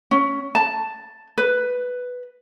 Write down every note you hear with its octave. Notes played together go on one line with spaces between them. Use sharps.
C#4
A5
B4